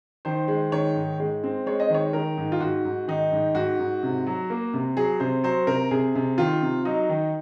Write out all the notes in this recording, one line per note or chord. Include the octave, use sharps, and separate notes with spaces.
D#3 C5
G#3
D#3 C#5
G#2
G#3
C4
G#3 C#5
D#5
D#3 C#5
D#3 A#4
G#2
F4
G#2 F#4
G#2
D#3 D#4
G#2
G#2 F#4
G#2
C3
F#3
A#3
C3
F#3 G#4
C3 C5
F#3 C5
C3 A#4
C3 G#4
C3
D#3 F4
C3
F#3 D#4
D#3